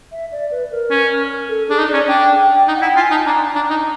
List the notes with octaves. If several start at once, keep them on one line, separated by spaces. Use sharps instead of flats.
E5
D5
B4
A#4
C#4
A4
D4 G#4
D#4
D5
C#4
D4 G5
D#4
F#5
E4
G5
F4
G#5
D#4 A5
D4 A#5
D4 A#5
D#4